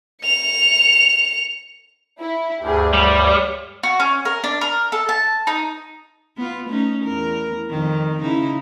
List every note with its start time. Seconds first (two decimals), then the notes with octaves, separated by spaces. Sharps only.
0.23 C#7 F7
2.21 E4
2.62 D2 G2 G4 G#4
2.93 G3 C#5
3.83 F#4
4.00 C#4
4.25 A#4
4.44 D4
4.61 A#4
4.92 A4
5.09 A5
5.47 D#4
6.37 B3 F4
6.69 A3 C#4 D#4
7.04 E2 A#4
7.70 F2 D#3
8.22 C#3 D#4 E4